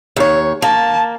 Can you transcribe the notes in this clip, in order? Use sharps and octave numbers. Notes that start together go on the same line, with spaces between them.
D#2 C#5
A#3 A5